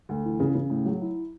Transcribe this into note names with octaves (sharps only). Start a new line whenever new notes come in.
D2
E3
C#3
C#3
A2
F#3
E4